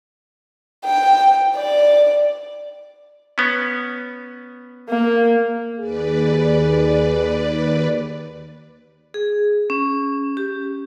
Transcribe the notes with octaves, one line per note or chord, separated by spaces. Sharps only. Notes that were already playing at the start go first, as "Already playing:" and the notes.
G5
D5
B3 C#4
A#3
D#2 G#4 B4 D5
G#4
C#4
G4